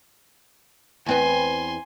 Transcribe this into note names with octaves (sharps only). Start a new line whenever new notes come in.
E2 C4 B4 G#5 C6